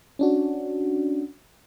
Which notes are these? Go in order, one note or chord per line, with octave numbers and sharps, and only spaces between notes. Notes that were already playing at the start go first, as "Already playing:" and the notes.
C#4 D4 F#4